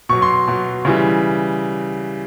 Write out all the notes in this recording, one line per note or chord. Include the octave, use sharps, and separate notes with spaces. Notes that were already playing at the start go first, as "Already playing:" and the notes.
B2 F#3 C#6
C6
B2 F#3
C#3 E3 G3